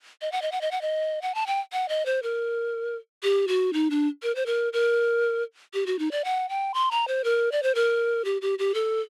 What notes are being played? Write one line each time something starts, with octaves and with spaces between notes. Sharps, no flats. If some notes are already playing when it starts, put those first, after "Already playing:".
D#5
F#5
D#5
F#5
D#5
F#5
D#5
F#5
A5
G5
F#5
D#5
C5
A#4
G4
F#4
D#4
D4
A#4
C5
A#4
A#4
G4
F#4
D#4
D5
F#5
G5
C6
A#5
C5
A#4
D5
C5
A#4
G4
G4
G4
A4